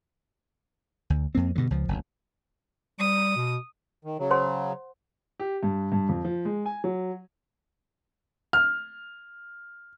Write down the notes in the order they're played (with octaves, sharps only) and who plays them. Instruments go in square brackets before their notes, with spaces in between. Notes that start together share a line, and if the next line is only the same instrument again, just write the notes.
[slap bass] D2
F2 A#3 C4
G2 B2 D3 F#3
C#2 F3
F#1 D2
[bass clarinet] G3 [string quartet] D#6
[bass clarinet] B2
[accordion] D#3
C#3 F#3
[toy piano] C5 F#5 C6
[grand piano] G4
G2
G2
F2
F3
G#3
G#5
F#3
F6